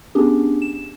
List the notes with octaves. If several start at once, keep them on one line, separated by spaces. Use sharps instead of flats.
B3 C#4 D4 G4 G#4
E7